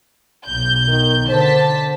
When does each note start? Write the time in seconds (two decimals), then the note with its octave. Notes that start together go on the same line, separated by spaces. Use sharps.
0.47 B1 G6
0.88 D#3
1.29 D3 C5 A5 B6